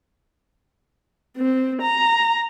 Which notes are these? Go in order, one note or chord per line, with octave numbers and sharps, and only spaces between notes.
C4
A#5